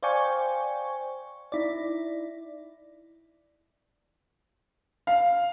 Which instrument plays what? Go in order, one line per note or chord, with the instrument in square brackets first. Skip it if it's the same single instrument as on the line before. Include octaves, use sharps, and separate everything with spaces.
[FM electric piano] C5 D5 F5 G5 G#5 C#6
D#4 E4 D5
[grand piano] F5